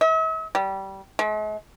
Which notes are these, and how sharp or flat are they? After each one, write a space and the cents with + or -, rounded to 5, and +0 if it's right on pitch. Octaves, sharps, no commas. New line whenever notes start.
E5 -45
G3 -20
G#3 +45